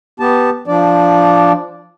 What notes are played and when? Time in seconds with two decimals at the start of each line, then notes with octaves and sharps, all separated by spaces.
0.20 B3 G4 A5
0.68 F3 D4 D5